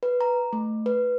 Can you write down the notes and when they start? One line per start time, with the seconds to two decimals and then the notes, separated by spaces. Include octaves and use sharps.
0.03 B4
0.21 A#5
0.53 A3
0.86 B4